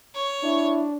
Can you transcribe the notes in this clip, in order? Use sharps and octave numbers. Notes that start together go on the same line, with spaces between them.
C#5
D4 E4